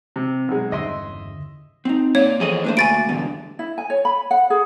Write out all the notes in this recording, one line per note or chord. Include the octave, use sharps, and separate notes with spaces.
C3
B1 G#3
G1 E2 C#3 D#5 E5 C6
C4 D#4
A#3 C#5 D5 F5
E3 F3 G#4 A4 C5 D#5
A3 A#3 D4 B4 C5
D2 F#4 G#5 B5 A6 D7
E2 G2 B2 D3
E4
G#5
C#5
B5
F#5
G#4